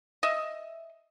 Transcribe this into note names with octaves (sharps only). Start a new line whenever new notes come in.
D#5 E5